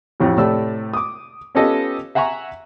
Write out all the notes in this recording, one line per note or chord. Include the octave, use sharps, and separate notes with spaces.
A1 F2 A2
A2 C3 A3 D5 E6
D6 D#6
B3 C#4 F4 G4 A4 D#5
E5 F#5 G#5 A#5 C#6